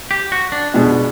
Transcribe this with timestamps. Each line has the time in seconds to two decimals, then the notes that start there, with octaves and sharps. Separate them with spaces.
0.11 G4
0.32 F#4
0.52 D4
0.74 B2 G#3 B3 D4